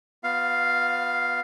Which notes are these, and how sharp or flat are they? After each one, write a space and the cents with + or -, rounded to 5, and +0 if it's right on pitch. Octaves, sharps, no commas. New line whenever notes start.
B3 +0 F4 +30 F5 +0